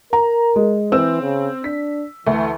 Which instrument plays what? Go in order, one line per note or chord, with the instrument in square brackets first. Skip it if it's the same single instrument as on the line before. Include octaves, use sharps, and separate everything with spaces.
[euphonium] A#4 [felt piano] A#5
[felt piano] G#3
[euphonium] E3 [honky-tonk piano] C4 [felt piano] E6
[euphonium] C#3
[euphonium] D4 [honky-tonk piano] B6
[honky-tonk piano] D2 A3 [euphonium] E3